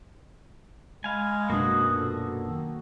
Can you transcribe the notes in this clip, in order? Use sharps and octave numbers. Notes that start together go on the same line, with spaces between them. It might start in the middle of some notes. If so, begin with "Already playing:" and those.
G#3 F5 G#5 B5
F#2 B2 A#3 D4 F#4 D#6
A#2 A4
D#3